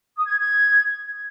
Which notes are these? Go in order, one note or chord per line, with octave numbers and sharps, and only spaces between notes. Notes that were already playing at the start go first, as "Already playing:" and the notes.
D#6
G#6
G#6